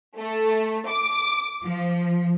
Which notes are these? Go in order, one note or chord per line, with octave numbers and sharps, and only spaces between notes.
A3
D6
F3